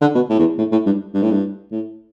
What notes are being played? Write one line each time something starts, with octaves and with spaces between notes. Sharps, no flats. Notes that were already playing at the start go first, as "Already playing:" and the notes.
D3
B2
A2
E2
A2
A2
G2
G2
A2
G2
A2